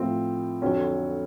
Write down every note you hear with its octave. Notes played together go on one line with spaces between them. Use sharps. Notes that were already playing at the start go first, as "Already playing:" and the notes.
Already playing: A2 F3 C4
F2 D3 F#3 C#4